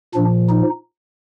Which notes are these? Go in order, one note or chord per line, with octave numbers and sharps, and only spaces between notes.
A#2 F3 D4
D#4